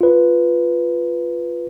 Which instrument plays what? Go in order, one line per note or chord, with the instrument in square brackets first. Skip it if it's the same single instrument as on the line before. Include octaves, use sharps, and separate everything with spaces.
[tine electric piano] F4 B4